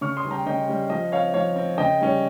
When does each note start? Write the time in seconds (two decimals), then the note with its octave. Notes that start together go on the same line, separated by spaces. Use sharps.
0.01 C#3 C#6 F6
0.17 C6 D#6
0.25 G3 C#4
0.31 G5 A#5
0.46 C#3 D#5 G5
0.68 G3 C#4
0.90 F3 D#5
1.12 C4 C#5 F5
1.34 F3 C#5 F5
1.56 C4
1.78 C#3 D#5 G5
2.01 G3 C#4